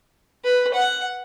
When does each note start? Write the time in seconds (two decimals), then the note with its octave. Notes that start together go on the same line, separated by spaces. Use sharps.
0.44 B4
0.74 F#5